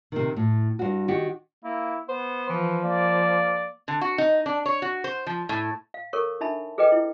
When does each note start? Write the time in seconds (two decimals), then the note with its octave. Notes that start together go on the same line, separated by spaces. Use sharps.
0.12 C3 D#3
0.36 A2
0.79 G2 F#4
1.08 D#3 F#4 G4
1.64 A#3 E4
2.09 B3 C5
2.49 E3 F3
2.84 A#3 D5
3.88 D3
4.01 F#4
4.18 D#4
4.46 D4
4.66 C#5
4.82 F#4
5.04 C5
5.27 F3
5.49 A2
5.94 F5
6.13 A4 A#4 C#5 C#6
6.41 D4 D#4 E5 A5 B5
6.78 G#4 A4 B4 D#5 G5
6.92 E4